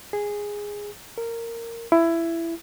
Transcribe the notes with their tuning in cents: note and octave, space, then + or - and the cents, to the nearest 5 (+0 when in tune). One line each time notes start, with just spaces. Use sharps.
G#4 -10
A#4 -15
E4 +15